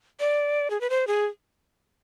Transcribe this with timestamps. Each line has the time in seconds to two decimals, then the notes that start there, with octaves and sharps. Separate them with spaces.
0.20 D5
0.70 G#4
0.81 B4
0.90 C5
1.07 G#4